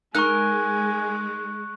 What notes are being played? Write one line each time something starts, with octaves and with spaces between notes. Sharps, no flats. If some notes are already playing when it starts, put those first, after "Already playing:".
G#3 D#4 A#4 G#5 A#5 C#6 F#6